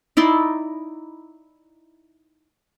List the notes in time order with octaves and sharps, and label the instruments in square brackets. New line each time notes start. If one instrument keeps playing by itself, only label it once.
[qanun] D#4 E4 D5 C6